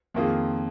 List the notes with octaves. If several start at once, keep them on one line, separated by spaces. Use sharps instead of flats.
F2 D#3 A#3 F4 G#4